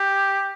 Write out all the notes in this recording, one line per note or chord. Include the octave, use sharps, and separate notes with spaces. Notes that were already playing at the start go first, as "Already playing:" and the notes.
Already playing: G4